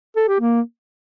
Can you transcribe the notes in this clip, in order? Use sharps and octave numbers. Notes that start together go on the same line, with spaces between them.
A4
G4
A#3